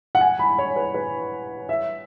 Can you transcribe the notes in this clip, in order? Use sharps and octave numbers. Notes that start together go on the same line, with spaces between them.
F#5
G#5
B5
C#5
B4
B4
E5